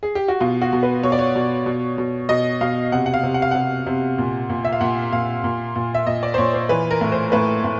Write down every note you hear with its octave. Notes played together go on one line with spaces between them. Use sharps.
G#4
G4
F#4
B2 F4
F#4
B2
B4
B2 C#5
D5
C#5
B2
B2
B2
B2 D#5
B2 F5
C3 F#5
F#5
F5
C3
F#5
F5
C3 F#5
C3
A#2
A#2
E5
F5
A#2 F#5
A#2 F5
A#2
A#2
E5
A#2 D#5
D5
C5
A#2 C#5
C5
E3 B4
A#4
A2
C5
A2 B4
A2